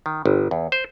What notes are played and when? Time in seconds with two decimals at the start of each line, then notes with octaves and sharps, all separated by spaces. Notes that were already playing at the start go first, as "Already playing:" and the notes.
0.06 D#3
0.26 G1
0.51 E2
0.72 C5